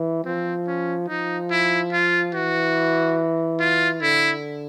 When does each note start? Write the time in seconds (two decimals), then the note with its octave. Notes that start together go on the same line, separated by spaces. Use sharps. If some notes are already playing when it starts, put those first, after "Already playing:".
Already playing: E3
0.25 F3 C4
0.67 C#4
1.09 F3 D#4
1.51 E4
1.92 F4
2.34 E3 F#4
3.60 F4
4.02 D3 E4